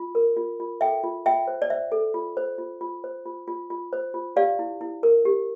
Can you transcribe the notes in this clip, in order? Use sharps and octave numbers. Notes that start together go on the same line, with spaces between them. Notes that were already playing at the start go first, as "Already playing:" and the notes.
Already playing: F4
A#4
F4
F4
A4 E5 G5
F4
F4 E5 G5
C5
D5
C5 E5
A4
F4
C5
F4
F4
C5
F4
F4
F4
C5
F4
G4 D5 F5
E4
E4
A#4
G4